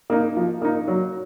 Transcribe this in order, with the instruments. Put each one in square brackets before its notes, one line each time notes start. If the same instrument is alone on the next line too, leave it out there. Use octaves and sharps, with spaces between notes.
[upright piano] A#3 D#4
F3
A#3 D#4
F#3